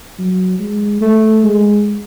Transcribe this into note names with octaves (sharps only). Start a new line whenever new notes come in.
F#3
G#3
A3
G#3